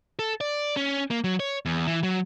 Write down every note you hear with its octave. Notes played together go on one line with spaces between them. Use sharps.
A4
D5
C#4
A#3
F#3
C#5
E2
E3
F#3